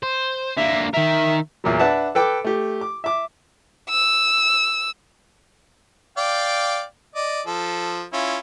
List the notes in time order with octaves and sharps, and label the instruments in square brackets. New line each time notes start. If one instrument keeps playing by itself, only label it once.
[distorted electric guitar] C5
[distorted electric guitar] D3 A#3 [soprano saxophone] E5
[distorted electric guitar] D#3 A#4 [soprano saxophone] E5
[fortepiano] E2 A#2 F#3
D4 B4 E5 F#5 A5
A4 B4 G5 D6
A3 G4
D6
E5 D6
[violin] E6
[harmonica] D5 F5 G5
D5 D#5
F3 A4
C#4 E4 F4